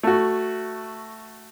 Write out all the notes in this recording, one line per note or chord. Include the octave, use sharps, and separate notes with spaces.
A3 F#4